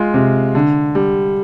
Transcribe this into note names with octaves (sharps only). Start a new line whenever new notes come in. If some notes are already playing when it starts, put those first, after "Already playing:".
Already playing: G#3 F4 F5
C3
D3
G3